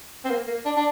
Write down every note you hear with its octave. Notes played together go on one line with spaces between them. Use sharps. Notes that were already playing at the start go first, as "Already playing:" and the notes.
C4
A#3
A#3
D4
D4